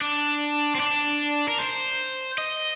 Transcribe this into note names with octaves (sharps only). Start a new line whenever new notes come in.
D4
C4
D4
A#4
C5
D#5